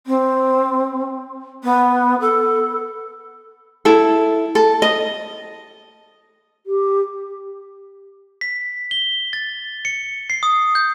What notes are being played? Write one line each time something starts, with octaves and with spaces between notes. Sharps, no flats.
C4
B3
A4
E4 A4
A4
D#5
G4
B6
G7
A6
C#7
C7
D#6
G6